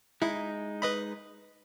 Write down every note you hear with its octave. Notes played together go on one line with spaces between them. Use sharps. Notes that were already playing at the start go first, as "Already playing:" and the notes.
G#3 D#4 E4
B4 D#5 B5